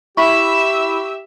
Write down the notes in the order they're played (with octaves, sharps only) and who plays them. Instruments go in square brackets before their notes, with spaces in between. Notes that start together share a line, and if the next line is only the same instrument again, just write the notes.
[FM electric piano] E4 B5 [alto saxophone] G4 [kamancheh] E5 E6 [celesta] C#6